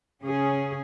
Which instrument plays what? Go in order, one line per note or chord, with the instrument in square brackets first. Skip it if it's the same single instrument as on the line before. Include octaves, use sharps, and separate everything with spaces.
[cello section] C#3 C#4 G#4